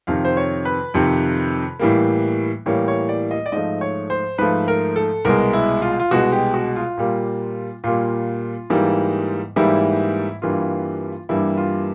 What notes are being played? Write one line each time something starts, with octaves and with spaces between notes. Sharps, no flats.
F2 C3 D#3 F5
C5
C#5
B4
F2 C3 D#3
A2 E3 G3 A#3
A2 E3 G3 A#3 C#5
C#5
D5
D#5
D5
G#2 F3 A3 D#5
C#5
C5
G#2 F3 A3 B4
A#4
A4
C2 B2 G#3 A#4
E4
F4
F4
C2 B2 G#3 F#4
G4
F#4
F4
A#2 G3 A#3
A#2 G3 A#3 F4
G#2 E3 G3 A#3
G#2 E3 G3 A#3 E4
G2 E3 G3 A#3 F4
G2 E3 G3 A#3 E4
F4